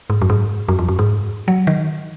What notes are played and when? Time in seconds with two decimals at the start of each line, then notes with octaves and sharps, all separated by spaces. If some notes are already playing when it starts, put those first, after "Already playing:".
0.10 G#2
0.22 F#2
0.30 G#2
0.68 F#2
0.79 F2
0.89 F#2
0.99 G#2
1.48 F#3
1.67 D#3